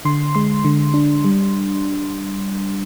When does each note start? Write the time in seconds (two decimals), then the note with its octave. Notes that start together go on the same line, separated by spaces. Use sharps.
0.05 D3 C6
0.35 G#3 C6
0.65 D3
0.94 D4
1.25 G3